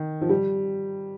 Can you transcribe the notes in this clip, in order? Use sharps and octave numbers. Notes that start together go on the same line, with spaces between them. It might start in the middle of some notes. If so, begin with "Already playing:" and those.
Already playing: D#3
F3
G3